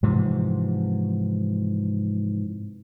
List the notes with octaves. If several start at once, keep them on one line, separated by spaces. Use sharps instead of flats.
G#2 C3 E3 F3